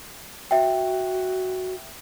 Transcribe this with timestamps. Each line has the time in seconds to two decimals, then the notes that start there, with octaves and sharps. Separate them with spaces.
0.51 F#4 E5 G5